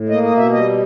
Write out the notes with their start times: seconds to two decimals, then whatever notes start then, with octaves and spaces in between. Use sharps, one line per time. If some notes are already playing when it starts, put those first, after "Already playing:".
Already playing: A2
0.09 A#3 D#5
0.23 D#5
0.31 B2
0.37 E5
0.52 G3 D#5